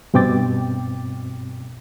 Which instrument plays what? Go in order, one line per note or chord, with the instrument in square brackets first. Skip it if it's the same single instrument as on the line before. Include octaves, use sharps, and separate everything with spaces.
[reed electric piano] G2 B2 C4 G5 D6 A6